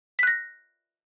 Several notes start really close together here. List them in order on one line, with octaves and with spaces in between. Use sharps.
B6 F#6 A#6